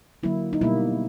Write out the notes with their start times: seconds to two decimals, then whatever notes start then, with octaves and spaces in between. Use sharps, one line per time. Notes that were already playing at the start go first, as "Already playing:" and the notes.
0.23 D3 F#3 A#3 E4
0.53 D#4
0.61 B2 G3 A#3 E4